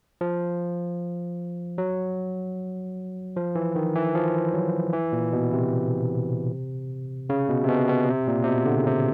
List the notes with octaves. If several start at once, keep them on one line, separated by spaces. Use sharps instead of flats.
F3
F#3
F3
E3
D#3
E3
F3
F#3
E3
A#2
B2
C3
C#3
B2
C3
B2
B2
C3
A#2
C3
B2
D3
C#3
C3